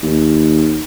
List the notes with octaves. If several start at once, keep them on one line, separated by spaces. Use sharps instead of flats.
D#2